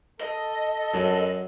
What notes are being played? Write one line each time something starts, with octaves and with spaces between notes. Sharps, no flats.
A4 D#5
F#2 F#3